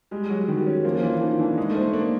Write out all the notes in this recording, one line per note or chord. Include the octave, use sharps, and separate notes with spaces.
G3 G#3
F#3 F#4
D#3 G3
C#4
F3 A#3
F3
E3 F4
D#3 F3
E3 D4
G#3 D#4
A3
C5
A3
A#3 D4